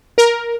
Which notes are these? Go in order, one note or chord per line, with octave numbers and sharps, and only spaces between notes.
A#4